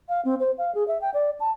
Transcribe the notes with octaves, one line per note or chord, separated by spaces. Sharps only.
F5
C4
C5
F5
G#4
E5
G5
D5
A5